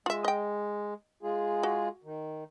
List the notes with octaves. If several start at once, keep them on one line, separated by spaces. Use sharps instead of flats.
G#3 F4 E5
D#5 G5
G#3 F4 G#4
F#4
D#3